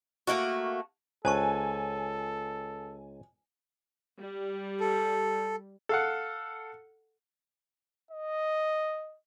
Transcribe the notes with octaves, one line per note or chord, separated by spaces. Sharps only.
A3 A#3 D#4 F#4
C#2 A4 C5 G#5 A5 C#6
G3
A4
A4 F5 F#5
D#5